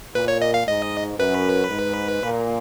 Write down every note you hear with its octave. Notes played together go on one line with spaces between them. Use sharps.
A#2 B4
C#5
D#5
F5
G#2 D#5
F#2 B4
G#2
A#2